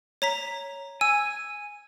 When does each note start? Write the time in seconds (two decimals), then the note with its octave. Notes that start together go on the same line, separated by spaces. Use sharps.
0.22 C#5 A#5 B6
1.01 G#5 E6